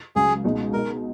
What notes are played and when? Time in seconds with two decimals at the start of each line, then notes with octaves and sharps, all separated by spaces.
0.16 C#2 C#3 F#3 G#4
0.44 C#2 B2 G#3 D#4 F#4
0.73 B2 G#3 D#4 A#4